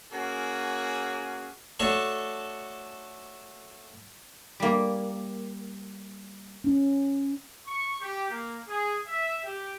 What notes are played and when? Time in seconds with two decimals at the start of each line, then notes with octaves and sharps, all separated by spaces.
0.12 A#3 C#4 F#4 G#4
1.79 A3 D4 F#4 A4 C#5 C#6
4.60 G3 A#3
6.64 C#4
7.66 C#6
8.00 G4
8.29 A#3
8.67 G#4
9.07 E5
9.43 G4